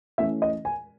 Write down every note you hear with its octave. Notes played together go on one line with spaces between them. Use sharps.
E3 A3 C#4 E5
D#5
G#5